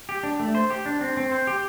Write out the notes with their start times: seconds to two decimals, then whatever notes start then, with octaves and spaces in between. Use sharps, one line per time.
0.09 G4
0.23 D4
0.40 A3
0.55 C5
0.70 G4
0.86 D4
1.01 C4
1.17 C4
1.32 C5
1.47 G4